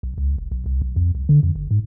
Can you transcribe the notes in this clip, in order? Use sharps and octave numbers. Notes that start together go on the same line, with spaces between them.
B1
C#2
F1
B1
C2
B1
F2
C2
D3
F2
G1
G#2